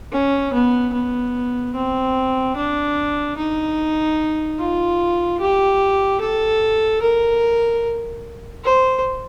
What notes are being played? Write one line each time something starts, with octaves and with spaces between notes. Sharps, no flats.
C#4
B3
B3
C4
D4
D#4
F4
G4
A4
A#4
C5